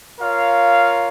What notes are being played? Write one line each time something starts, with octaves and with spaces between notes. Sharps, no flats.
F4 A#4 C#5 F5